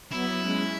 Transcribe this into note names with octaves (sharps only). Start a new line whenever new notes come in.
F#3 B3 E4
G#3 C#4